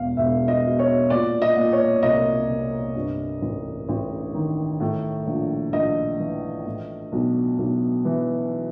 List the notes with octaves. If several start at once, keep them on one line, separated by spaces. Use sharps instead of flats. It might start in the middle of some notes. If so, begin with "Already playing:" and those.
Already playing: E1 E2 F5
E1 E5
D#5
B2
C#5
A#2 D5
D#5
A#2
C#5
C2 D#5
C2
G2
A1
A1
D#3
A2
A#1
A#1 D#5
E3
A2
B1
B1
E3